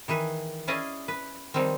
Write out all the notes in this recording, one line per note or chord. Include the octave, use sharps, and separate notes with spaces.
D#3 E3 G#4 B4
C#4 E4 G#4 D5 D#5 F5
B4
D#3 F3 G3 G#3 C4